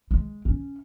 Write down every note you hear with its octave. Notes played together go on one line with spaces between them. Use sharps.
G#3
C#4